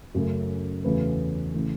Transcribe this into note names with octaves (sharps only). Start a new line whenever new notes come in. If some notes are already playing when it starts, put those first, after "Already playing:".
F#2 C#3 A3
E2 C#3 A3 F#4 B4
C#3 E3 A3